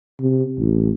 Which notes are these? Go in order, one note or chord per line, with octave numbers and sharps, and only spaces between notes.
C3
A1